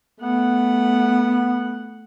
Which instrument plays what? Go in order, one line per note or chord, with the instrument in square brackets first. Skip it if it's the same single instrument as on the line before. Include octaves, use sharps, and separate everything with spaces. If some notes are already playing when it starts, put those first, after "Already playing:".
[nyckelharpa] A3 F#5 [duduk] B3